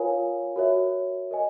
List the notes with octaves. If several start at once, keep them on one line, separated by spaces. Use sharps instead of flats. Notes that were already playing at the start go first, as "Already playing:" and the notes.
Already playing: F4 A#4 C#5 F5 G#5
F#4 A#4 C#5 E5
A#4 D#5 G#5